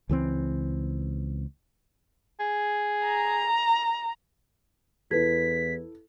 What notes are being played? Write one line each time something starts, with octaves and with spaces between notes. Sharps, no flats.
C#2 E3 F#3 C4
G#4
A#5
E2 E4 A4 B4 G#6 B6